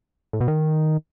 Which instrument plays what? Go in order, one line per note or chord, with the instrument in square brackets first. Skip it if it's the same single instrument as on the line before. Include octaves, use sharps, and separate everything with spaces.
[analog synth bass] A2
B2
D#3